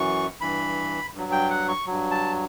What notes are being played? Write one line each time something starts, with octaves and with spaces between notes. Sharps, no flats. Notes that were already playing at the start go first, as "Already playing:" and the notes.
Already playing: F#2 E3 C#6
G2 E3 B5
G2 F#3
G5
F#5
C#6
G2 F#3
A5